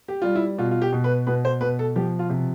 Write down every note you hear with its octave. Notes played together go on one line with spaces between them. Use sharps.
G4
G3 F4
E4
B2 F4
F4
G4
B2
B4
B2 B4
C5
B2 B4
A4
F3 G4
F4
C3